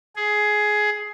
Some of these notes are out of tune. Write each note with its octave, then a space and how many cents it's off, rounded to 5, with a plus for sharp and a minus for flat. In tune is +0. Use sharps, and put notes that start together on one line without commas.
G#4 +15